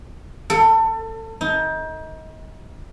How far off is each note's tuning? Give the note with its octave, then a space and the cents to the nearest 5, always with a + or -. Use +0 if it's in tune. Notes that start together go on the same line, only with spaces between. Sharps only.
A4 +25
D#4 +30